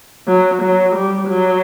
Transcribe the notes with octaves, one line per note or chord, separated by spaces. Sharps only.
F#3
F#3
G3
F#3